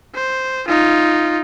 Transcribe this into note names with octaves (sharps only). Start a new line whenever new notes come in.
C5
D#4 F4